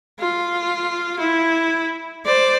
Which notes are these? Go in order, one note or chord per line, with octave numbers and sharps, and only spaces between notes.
F4
E4
C5 D5